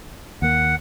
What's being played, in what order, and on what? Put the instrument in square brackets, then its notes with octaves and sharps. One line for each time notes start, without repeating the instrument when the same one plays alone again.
[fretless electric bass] D#2 A#3 [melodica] F#5